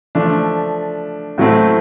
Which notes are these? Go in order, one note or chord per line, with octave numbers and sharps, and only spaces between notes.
F3 A3 D4
A2 F#3 A3 C4